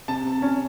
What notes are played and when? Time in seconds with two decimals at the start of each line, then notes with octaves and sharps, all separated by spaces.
0.08 C3 A5
0.25 C3
0.42 C#4